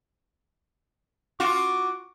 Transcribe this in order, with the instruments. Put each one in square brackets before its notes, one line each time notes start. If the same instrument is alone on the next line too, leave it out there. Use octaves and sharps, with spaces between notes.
[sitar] F4 F#4 [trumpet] D6